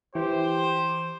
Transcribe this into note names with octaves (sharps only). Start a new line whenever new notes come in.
E3 G4 C5